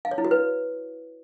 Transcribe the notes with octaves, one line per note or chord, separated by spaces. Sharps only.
F5
C#5
E4
F#4
B4